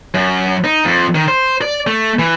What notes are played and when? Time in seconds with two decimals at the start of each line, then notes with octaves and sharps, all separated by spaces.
0.14 F#2
0.65 D#4
0.85 F2
1.15 D#3
1.28 C5
1.62 D5
1.87 A3
2.19 E3